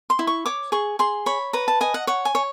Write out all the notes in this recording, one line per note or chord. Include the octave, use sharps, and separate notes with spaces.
C6
E4
C#6
C#5 D6
G#4 C#6
G#4 C6
C#5 B5
B4 A#5
A5
D#5 G#5
F#5
C#5 F#5
G#5
C#5